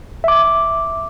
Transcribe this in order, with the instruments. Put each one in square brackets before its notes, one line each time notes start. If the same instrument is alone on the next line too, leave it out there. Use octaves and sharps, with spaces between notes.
[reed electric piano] E5 D6